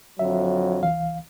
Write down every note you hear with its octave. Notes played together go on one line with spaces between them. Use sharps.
F2 D3 F#3 E5
C2 E3 F5